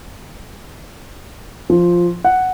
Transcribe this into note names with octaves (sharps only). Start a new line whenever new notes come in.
F3
F#5